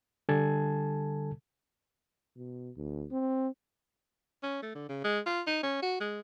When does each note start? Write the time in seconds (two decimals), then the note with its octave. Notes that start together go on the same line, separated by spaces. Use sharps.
0.29 D3 G3 A4 G#5 A5 G#6
2.37 B2
2.77 D2
3.11 C4
4.43 C#4
4.63 A3
4.75 D3
4.89 C#3
5.04 G#3
5.26 F4
5.47 D#4
5.63 C#4
5.83 F#4
6.00 G#3